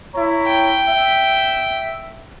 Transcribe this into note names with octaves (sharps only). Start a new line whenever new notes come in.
E4 C#5 A#5
G5
E5